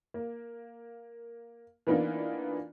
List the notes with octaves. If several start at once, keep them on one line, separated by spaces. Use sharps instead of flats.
A#3
E3 A#3 B3 D4 D#4 F4